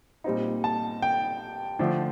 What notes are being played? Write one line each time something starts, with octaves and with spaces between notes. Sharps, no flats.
A#2 G3 C4 D#4
A5
G5
D3 F3 A3 D4